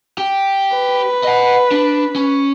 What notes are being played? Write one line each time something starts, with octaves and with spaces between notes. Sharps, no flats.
G4
B4
D#5 F#5
D4
C#4